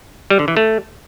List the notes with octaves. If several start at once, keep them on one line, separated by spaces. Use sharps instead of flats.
G3
D3
E3
A3